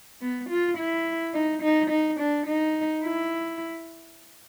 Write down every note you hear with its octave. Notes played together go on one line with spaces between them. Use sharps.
B3
F4
E4
D#4
D#4
D#4
D4
D#4
E4